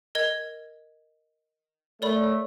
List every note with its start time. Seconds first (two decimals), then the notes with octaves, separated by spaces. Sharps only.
0.15 A#4 D#5 G#6
2.02 A3 A#4 C#5 D5 B5